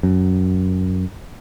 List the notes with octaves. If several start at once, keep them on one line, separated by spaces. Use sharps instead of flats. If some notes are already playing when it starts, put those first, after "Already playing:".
F#2